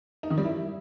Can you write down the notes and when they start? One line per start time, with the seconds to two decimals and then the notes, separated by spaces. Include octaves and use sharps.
0.23 D#4
0.30 D#3
0.38 G3
0.45 E4